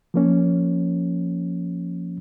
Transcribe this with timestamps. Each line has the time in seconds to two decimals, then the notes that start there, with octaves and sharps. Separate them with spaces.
0.14 F3 A#3 C#4